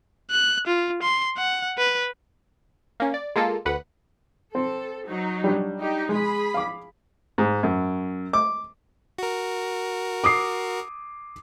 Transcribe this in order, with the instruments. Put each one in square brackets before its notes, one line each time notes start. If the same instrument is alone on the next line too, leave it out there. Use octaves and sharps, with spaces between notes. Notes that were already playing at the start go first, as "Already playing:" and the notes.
[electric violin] F#6
F4
C6
F#5
B4
[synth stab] A#3 C#4
D5
G#3 A#3 F4 A4
D2 B4 F#5
[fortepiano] C4 [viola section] A4
[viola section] F#3 D#4
[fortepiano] G3 D4
[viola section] D#4 G4
[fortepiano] G#3 [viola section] G#4 B5
[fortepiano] F5 D6
G#2
F#2
D6
[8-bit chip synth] F#4 A#4
[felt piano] D6 D#6 C7